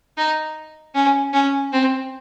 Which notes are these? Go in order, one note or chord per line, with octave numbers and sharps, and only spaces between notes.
D#4
C#4
C#4
C4